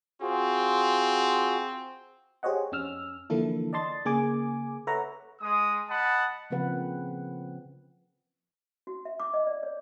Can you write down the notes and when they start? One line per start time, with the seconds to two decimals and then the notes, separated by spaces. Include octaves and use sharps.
0.21 C4 F4 F#4 G#4
2.43 G4 G#4 C5 C#5 D#5 F#5
2.72 F2 C#4 E6 F6
3.30 D3 E3 F3 A#3 E4 A4
3.73 D5 D#5 A5 C6 A6
4.05 C#3 A#3 G#4 G#5 D6
4.87 A4 B4 C#5 E5 F#5 A#5
5.41 G#3 D#6
5.89 D#5 F#5 A5 B5
6.50 C#3 F3 A#3 C4 B4 F#5
8.87 F#4
9.05 E5
9.20 D6
9.34 D#5
9.47 D5
9.63 C#5